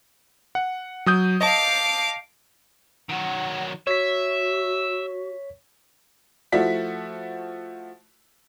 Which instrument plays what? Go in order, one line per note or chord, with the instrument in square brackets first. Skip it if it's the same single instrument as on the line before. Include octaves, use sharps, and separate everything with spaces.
[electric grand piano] F#5
F#3 D#6 G6
[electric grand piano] D#5 A5 [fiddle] F5 D6
[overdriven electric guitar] D#3 F#3 [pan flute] F#5
[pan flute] F#4 [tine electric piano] C#5 B6 [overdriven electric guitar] E5
[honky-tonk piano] F3 A3 E4 F#4 B6